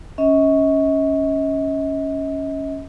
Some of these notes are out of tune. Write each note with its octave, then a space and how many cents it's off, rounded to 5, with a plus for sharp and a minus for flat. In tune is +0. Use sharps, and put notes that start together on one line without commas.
C#4 +0 D#5 +40